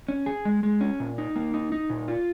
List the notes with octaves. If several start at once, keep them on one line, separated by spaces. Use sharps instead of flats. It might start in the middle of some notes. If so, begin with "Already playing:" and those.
C#4
G#4
G#3
G#3
C#4
A#2
D#4
A#3
D#4
D#4
A#2
F4